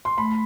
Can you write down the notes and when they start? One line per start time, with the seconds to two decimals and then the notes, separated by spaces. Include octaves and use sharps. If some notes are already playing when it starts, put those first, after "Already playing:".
0.05 C6
0.18 A3 B5